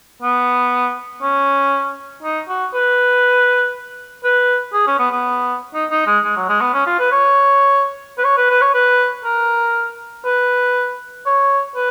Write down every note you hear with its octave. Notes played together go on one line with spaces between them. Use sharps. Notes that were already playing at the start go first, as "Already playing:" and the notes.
B3
C#4
D#4
F#4
B4
B4
G#4
C#4
B3
B3
D#4
D#4
G#3
G#3
F#3
G#3
B3
C#4
F4
B4
C#5
B4
C#5
B4
B4
C#5
B4
A#4
B4
C#5
B4